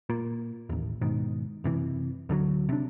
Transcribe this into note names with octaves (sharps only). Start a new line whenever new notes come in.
A#2
A1 D#2
G#2 B2 D#3
F#1 C3 E3
D2 D3 F3 F#3
C3 D4